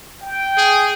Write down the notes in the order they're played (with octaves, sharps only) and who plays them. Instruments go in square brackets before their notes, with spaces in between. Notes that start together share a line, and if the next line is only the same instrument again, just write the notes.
[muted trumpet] G5
[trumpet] G#4